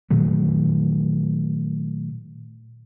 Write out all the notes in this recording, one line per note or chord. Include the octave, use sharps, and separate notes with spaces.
A#2 D#3 F#3 A3